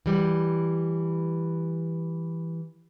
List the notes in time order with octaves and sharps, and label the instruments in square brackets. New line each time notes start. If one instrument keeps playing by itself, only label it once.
[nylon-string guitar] E3 G3